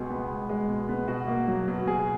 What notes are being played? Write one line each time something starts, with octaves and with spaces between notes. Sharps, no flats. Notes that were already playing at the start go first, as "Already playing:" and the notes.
Already playing: C#2 B2 G#3 G#4
B3
C#2
G#3
B2
B3
B2 F#4
A#3
F#3
B2
B2 G#4